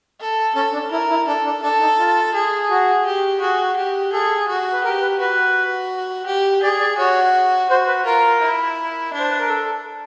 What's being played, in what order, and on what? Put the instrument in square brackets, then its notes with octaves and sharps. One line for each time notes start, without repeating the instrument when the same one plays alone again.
[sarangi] A4
[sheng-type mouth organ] C#4 [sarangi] A4
[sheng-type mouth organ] D4
[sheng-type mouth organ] E4 [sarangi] A#4
[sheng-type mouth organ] E4
[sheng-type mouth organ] D4 [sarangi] A4
[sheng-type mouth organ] D4
[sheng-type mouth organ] D4 [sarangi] A4
[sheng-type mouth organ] D#4
F4
[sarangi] G#4
[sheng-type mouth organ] F#4
[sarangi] G4
[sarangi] F#4 [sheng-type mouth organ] G#4
[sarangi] G4
[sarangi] G#4 [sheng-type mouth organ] A4
[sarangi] F#4
[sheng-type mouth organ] B4
[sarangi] G4 [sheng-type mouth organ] A#4
[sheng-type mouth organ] B4
[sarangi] F#4 [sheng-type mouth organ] B4
[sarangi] G4
[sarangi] G#4 [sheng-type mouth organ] D5
[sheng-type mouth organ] D5
[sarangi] F#4 [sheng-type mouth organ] C#5
[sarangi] F#4 [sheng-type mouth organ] C5
[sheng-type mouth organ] B4
[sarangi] F4 [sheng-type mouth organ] A#4
[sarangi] E4
D4
[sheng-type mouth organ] C5
B4
A#4
A4